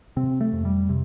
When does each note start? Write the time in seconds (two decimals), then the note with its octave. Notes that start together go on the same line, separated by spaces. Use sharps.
0.16 C3 C4
0.41 A3
0.53 F2
0.65 G3
0.89 C3